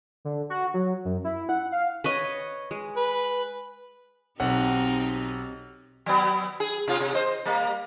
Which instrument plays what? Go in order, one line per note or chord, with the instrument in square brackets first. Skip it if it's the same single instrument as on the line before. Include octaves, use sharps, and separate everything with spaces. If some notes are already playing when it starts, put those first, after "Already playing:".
[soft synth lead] D3
F#4
F#3
F#2
E4
F#5
F5
[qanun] B4 C#5 D#5
G#3
[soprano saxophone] B4
[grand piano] B1 F#5 [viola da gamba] C4 D#4 G4
[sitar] F#3 B3
G#4
C3 F4
C3
C5 D#5
G3 A#3